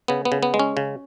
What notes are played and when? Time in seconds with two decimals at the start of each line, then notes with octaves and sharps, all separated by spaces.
0.08 C#3 B3
0.25 B3
0.32 C#3
0.43 B3
0.54 G#3
0.59 C#4
0.77 C#3